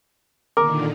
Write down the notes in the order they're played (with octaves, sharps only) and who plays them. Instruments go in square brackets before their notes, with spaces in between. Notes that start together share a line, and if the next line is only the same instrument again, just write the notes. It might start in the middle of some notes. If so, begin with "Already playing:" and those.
[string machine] A#2 D3 D#3 [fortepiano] A#4 [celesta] D6